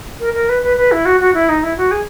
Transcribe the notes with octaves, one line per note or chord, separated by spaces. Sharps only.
A#4
A#4
B4
B4
B4
E4
F#4
F#4
E4
D#4
E4
F#4
G#4